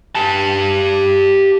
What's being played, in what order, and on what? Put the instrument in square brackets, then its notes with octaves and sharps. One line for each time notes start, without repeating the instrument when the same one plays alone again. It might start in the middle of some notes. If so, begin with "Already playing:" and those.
[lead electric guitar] G4 A5